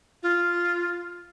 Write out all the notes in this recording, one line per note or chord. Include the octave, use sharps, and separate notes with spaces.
F4